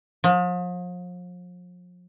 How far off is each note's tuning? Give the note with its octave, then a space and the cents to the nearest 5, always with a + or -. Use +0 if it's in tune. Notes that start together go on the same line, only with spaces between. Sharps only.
F3 +40